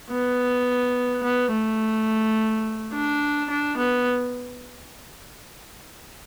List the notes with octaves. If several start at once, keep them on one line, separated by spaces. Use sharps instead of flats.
B3
B3
A3
D4
D4
B3